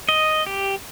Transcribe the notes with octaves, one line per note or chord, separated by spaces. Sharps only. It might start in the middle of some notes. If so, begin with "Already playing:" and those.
D#5
G4